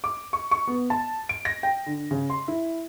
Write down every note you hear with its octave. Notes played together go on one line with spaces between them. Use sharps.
D6
C#6
C#6
B3
A5
D7
A#6
G5
D3
C#3
C6
E4